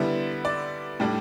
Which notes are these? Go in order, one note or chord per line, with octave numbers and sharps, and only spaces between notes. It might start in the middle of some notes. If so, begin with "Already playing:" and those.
Already playing: D3 G3 B3 E4 E5
D5
A2 G3 D4